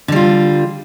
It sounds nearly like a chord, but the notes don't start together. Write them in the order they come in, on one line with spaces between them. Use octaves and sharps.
D3 G3 F4